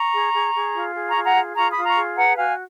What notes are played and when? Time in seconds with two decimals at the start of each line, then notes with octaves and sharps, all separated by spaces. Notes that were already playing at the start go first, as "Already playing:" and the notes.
Already playing: A#5 C#6
0.13 G#4
0.33 G#4
0.54 G#4
0.73 F4
0.94 G#4
1.09 A#5 C#6
1.15 F4
1.24 F#5 A#5
1.35 G#4
1.55 F4 A#5 C#6
1.70 B5 D#6
1.76 F4
1.85 A#5 C#6
1.95 G#4
2.17 B4 F#5 A#5
2.36 F#4 F5 G#5